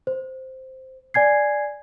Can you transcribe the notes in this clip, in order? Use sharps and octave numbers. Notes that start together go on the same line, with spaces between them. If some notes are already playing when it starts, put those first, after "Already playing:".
C5
D5 G#5 G#6 C7